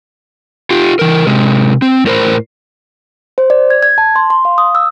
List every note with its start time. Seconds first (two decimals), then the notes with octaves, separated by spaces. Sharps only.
0.70 F4 G4
0.99 E3 A#4
1.27 C3 G#3
1.82 C4
2.06 A2 A#4 C5
3.38 C5
3.50 D5
3.70 G#6
3.83 G#6
3.98 A5
4.16 C6
4.30 C6
4.45 F5
4.58 D#6
4.75 E6